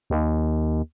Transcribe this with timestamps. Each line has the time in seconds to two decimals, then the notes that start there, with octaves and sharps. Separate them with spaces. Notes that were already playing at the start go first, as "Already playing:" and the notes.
0.10 D#2